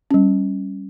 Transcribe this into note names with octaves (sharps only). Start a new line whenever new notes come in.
G3 C#4